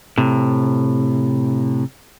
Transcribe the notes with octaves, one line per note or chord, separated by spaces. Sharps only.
A2 C3